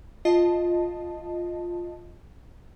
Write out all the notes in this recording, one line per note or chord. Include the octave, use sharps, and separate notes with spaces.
F4 D#5 A5